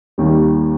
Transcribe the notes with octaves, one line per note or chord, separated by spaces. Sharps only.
D#2 D#3 G3